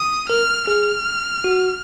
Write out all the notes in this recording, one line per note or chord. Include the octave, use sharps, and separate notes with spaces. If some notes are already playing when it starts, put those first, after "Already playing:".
Already playing: D#6
A#4 F6
G#4 F6
F#4